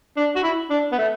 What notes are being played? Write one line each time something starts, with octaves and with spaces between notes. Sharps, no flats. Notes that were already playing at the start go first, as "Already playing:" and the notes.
D4
F#4
E4
D4
B3
A3